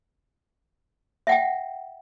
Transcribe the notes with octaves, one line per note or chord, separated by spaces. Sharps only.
E5 F#5 G5